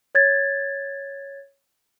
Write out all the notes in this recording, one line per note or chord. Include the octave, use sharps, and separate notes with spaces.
C#5 G#6 A6